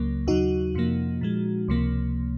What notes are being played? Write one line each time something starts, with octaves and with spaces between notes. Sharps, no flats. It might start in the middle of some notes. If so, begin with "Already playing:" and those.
Already playing: C#2 C#3 F#3 A#3
D#2 C#3 F#3 D#4 F#4
F2 C3 F3 A#3
A#2 F3 G#3
C#2 C3 F3 A#3